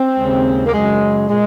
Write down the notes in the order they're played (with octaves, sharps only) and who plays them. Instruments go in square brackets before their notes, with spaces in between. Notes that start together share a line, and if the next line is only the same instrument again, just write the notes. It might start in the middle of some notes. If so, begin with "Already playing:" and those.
Already playing: [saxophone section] C4
D#2 C#3 G#3
A#3
F#2 C#3 F#3 G#3
A#2 G#3